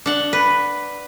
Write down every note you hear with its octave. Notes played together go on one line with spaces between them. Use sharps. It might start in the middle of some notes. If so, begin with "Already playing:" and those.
D4 F#5
B4